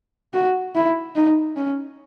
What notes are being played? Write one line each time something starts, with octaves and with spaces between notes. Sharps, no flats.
F#4
E4
D#4
C#4